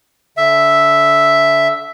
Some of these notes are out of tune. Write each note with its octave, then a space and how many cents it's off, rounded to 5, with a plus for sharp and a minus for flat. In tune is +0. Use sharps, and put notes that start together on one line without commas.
D3 -25 E5 +0